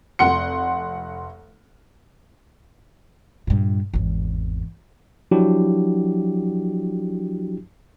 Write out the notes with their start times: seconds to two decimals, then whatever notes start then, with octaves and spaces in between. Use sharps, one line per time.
0.19 F1 F#5 C6 C#7
3.47 G2 A#2
3.94 G#1 E2
5.31 F3 F#3 D4 E4 F#4 G4